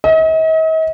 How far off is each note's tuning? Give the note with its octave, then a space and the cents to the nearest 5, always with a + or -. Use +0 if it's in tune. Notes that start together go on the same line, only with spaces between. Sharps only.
D#5 +45